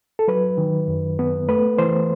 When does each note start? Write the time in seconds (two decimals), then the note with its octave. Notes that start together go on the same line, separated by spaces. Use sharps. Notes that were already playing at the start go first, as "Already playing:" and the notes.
0.19 A4
0.28 F#3 B4
0.58 D#3
0.88 F#2
1.19 B3
1.49 A3 B4
1.78 E3 C5